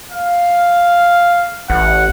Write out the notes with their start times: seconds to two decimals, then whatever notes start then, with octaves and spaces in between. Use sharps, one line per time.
0.11 F5
1.70 A1 F#5